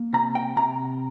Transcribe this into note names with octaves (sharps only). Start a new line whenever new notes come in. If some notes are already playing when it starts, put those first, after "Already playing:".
Already playing: A#3
C3 A#5
G5
C3 A#5